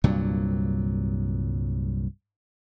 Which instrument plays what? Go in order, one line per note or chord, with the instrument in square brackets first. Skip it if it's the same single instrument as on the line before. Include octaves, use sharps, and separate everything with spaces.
[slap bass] C2 G2 A#2 F#3